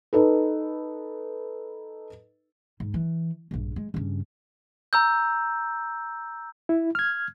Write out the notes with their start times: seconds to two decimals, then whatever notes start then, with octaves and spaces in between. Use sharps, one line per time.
0.13 D#4 A4 B4
2.80 G#2
2.94 E3
3.51 A#1 G2
3.76 G#3
3.94 G2 C#3
4.93 A#5 E6 G6
6.69 E4
6.95 F6 G#6